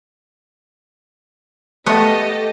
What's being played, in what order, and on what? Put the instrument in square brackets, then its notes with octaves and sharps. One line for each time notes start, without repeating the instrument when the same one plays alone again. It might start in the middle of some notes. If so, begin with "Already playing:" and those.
[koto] A3 B3 [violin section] G4 A4 D#5